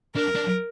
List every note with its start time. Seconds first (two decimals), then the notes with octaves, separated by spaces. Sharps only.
0.15 D4 A#4
0.35 D4